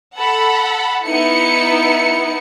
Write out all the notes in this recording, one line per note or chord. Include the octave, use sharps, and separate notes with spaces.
A4 F#5 B5
B3 D#4 E4 C#7